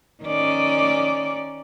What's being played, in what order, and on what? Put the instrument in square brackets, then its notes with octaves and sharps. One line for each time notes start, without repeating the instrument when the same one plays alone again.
[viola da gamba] D#3 C#4 D5